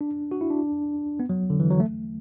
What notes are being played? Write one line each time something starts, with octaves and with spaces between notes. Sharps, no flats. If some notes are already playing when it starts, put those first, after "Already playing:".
D4
F#4
E4
D4
B3
F#3
D3
E3
F#3
A3